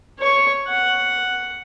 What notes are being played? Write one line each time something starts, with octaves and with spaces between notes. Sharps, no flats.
C#5 C#6
F#5